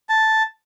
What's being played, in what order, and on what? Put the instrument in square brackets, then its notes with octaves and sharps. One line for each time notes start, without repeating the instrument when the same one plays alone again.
[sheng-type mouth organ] A5